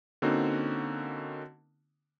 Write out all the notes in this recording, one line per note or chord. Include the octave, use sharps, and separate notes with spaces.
D3 A#3 C4 C#4 D#4 F#4